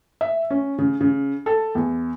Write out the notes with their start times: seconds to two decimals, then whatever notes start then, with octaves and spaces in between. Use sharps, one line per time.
0.21 E5
0.50 C#4
0.78 C#3
1.01 C#3
1.46 A4
1.75 E2